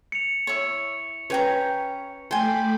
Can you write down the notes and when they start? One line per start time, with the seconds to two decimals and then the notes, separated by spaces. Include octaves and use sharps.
0.12 C#7 F7
0.47 E4 C#5
1.30 C#4 B4 C#5 G5 A#5
2.31 A3 G5 G#5 B5 C6 D6